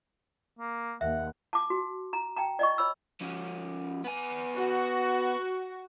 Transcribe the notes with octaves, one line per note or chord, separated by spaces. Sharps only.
A#3
D#2 E5 F#5
A5 D6
F#4
A#5
G5 A5 A#5
D5 D#5 C#6
C#5 B5 E6
F3 C#4
B3 G#5
F#4